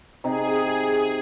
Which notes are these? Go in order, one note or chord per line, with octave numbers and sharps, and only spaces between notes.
C3 D#4 G#4